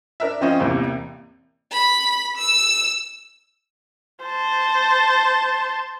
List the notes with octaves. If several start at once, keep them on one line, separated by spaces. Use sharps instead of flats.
D4 A#4 E5
F3 C4 C#4 D#5
A1 E2 C3 A#3
B5
E6
C5 A5